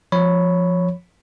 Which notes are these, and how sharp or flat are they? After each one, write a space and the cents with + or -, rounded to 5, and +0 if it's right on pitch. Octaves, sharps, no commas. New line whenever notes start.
F3 +0 C#5 +0 B5 +0